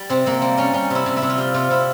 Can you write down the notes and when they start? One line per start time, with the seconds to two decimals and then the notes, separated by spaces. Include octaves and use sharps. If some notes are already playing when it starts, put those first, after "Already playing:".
Already playing: G3
0.10 C3 C4
0.26 C3 A#3
0.42 G3 C4
0.57 G3 C#4
0.73 G3 C#4
0.90 C3 E4
1.06 C3
1.17 E4
1.22 C3
1.30 F4
1.38 G3 G4
1.54 C3 F4
1.70 C3 E4